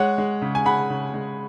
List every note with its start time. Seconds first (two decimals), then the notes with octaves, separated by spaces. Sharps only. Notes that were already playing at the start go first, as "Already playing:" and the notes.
Already playing: G#3 C#5 F#5
0.18 G#3
0.42 C#3
0.55 G#5
0.65 C#3 F#5 B5
0.90 C#3
1.14 G#3